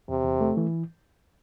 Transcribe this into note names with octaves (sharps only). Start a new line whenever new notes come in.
E2 C3
E2
A3
E3